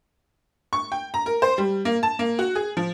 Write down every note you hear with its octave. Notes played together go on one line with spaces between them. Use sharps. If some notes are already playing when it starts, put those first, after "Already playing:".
C#6
G5
A#5
A#4
C5
G3
A#3
A5
A#3
F#4
G#4
F3